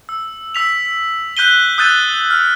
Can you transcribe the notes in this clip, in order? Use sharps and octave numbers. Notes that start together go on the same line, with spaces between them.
E6
E6 B6 F7
F#6 G6 B6 D#7 G7
D#6 E6 F#6 G6 A6 D#7
F6